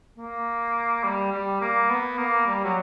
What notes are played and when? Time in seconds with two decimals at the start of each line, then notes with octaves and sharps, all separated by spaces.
0.17 A#3
1.04 G3
1.32 G3
1.61 A#3
1.89 B3
2.18 A#3
2.47 G3
2.64 F#3